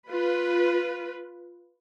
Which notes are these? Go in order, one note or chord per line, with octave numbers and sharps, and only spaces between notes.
F4 B4